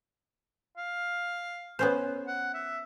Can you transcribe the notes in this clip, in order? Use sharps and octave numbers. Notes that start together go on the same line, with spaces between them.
F5
B3 C#4 C5
F#5
E5